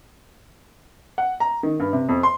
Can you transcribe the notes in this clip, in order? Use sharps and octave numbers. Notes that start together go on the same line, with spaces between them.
F#5
A#5
D#3
G2
C3
F2
C6